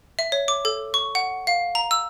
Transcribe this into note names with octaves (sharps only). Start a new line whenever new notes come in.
E5
C#5
D6
A4
C#6
F#5
F5
A#5
E6